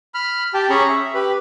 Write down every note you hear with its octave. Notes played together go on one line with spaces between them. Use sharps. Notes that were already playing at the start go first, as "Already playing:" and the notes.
B5 F6
G4 G5 A5
C#4 G#4 A#5 B5 C#6
E5
G4 B4 B5